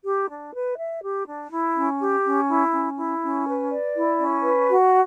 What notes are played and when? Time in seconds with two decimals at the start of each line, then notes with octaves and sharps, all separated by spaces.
0.04 G4
0.29 D4
0.54 B4
0.78 E5
1.02 G4
1.27 D4
1.51 E4
1.75 C#4
2.00 G4
2.24 C#4
2.49 E4
2.73 C#4
2.97 E4
3.22 C#4
3.47 B4
3.70 D5
3.95 E4
4.19 C#4
4.43 B4
4.68 F#4